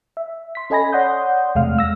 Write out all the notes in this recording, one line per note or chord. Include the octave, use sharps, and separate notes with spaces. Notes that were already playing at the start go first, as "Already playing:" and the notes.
E5
C6 B6
C#4 A4 D#5 G#5 B5 A#6
C#5 D5 F#5 C6 D#6 G6
E2 C3 G#3 A3 F5 F6
E6 A#6